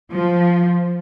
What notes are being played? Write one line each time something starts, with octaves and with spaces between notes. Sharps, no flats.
F3